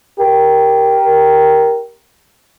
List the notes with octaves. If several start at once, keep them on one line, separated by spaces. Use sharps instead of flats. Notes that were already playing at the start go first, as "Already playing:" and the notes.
G4 A#4